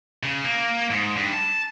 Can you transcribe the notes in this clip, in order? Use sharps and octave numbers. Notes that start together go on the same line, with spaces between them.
C#3
A#3
G#2
G2
A5